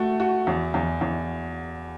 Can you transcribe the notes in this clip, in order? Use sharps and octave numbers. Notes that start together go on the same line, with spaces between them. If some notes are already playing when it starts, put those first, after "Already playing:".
Already playing: A3 F#4
F#4
E2
E2
E2